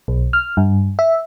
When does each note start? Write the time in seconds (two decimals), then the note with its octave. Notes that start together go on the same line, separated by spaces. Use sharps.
0.08 B1
0.33 F6
0.57 G2
0.99 E5